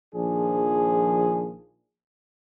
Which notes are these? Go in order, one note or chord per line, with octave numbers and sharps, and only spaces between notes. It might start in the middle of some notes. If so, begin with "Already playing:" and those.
A#1 D#3 F3 D4 G#4